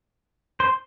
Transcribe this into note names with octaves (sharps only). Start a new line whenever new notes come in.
C5